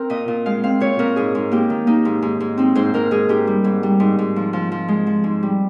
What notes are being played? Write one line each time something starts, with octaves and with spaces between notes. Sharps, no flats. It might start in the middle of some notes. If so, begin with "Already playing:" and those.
Already playing: C4 A#4
A#2 D#5
A#2
G#3 F5
C4 F5
A#2 C#5
A#2 A#4
G#2 G#4
G#2
A#3 G4
D#3
A#3 D#4
G#2
G#2
G#2
C4 D#4
G#2 C5
G#2 A#4
G#2 G#4
G#2 G4
G3
G#2
G3
G#2
G#2
F3
F3
F3
G#3
F3
G#2
G3